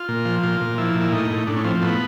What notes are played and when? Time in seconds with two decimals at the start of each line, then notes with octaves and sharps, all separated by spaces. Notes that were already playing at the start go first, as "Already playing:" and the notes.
Already playing: F4
0.08 A#2
0.25 F3
0.43 A#2 F4
0.61 A#2
0.78 F3 E4
0.95 A#2
1.00 E4
1.12 A2 D#4
1.30 A2
1.47 A2 D4
1.56 C#4
1.64 F3 C4
1.82 A2 B3